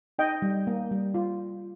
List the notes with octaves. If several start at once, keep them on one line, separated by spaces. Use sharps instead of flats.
D#4 D#5 G5
G3
A#3
G3
F4